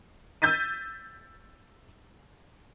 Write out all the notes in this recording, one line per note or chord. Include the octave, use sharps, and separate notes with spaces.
E6 G6 A6 B6 D#7